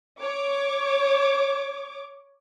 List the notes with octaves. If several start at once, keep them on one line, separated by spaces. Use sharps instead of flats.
C#5 D6